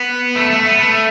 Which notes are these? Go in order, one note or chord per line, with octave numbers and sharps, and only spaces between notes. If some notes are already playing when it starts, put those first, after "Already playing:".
Already playing: B3
A3
A3
B3
A3